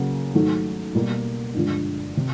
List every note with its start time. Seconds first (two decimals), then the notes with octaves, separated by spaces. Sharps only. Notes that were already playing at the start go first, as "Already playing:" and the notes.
Already playing: C#3 F#3 A#3
0.34 G#2 D#3 F#3 A3
0.95 B2 G3 A#3
1.54 G2 D3 F3 G#3
2.17 C3